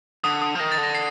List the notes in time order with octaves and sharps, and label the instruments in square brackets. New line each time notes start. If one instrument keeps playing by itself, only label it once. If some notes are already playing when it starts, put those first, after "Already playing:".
[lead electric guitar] D3 [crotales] D#6
[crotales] D#6
[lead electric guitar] F3
[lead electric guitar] D#3 [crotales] A#6
[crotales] A6
[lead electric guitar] D3
[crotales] A#6
C7